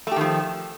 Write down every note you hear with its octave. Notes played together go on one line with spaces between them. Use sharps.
D#3 F3 A3 G4